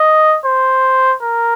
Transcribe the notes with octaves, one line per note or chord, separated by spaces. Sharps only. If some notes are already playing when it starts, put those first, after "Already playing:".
Already playing: D#5
C5
A#4